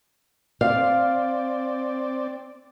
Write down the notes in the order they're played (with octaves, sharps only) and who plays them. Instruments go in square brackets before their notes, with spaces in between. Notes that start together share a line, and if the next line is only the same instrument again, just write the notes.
[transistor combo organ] C4 D5 [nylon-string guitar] F5